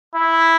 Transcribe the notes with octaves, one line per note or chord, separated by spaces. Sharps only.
E4